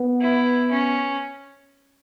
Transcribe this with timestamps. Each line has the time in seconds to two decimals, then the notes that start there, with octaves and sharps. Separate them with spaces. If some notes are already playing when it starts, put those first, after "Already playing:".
Already playing: B3
0.21 E4
0.71 C#4